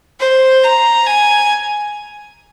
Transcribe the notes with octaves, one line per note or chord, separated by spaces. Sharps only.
C5
A#5
G#5